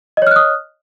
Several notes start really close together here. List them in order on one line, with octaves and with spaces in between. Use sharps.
D#5 C#5 F6 F#6 D#6